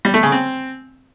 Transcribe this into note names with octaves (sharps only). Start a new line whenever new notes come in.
G3
A3
C#3
C4